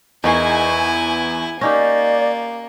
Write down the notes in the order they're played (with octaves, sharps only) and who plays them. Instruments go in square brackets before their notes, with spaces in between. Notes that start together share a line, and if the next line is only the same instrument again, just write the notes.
[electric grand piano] E2 C#6 C7 [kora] D#4 G#4 A#4 [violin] E4 G#5
[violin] A#3 [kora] C#4 D#4 G4 [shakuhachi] D5 [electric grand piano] A#6